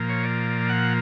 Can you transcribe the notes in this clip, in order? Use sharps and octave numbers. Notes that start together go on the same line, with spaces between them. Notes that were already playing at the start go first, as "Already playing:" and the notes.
Already playing: A#2 F3 A#3
C#5
D5
F#5